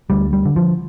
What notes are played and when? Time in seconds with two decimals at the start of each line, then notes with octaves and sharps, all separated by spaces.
0.10 D2 G3
0.33 G3
0.45 D3
0.56 F3